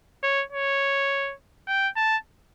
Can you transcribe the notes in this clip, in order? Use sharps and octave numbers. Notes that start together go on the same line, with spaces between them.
C#5
C#5
G5
A5